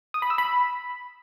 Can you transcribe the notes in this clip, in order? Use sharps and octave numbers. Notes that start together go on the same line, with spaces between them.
D#6
B5
E6
B5